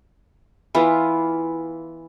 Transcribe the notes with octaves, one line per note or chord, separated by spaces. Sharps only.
E3 B3 F4